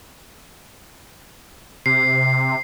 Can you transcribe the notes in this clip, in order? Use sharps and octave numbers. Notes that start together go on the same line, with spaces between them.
C3 C7